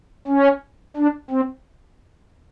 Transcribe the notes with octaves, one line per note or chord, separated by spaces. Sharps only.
C#4
D4
C4